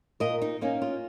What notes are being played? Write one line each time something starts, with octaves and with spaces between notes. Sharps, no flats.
A#2 A#4 D#5
D#4
A#3 C#4 D#4
F4